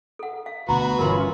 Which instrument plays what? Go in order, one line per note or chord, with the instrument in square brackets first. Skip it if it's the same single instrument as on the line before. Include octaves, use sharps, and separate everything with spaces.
[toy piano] A4 F#5
F5
[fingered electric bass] D2 B2 [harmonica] F#4 B4 [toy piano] A#5
[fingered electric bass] G1 [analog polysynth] E3 C#4 F4 [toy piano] A#4 B5 C6